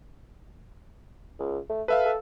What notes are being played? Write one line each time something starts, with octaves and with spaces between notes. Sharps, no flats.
C#2
A3
A4 B4 E5 F5
A4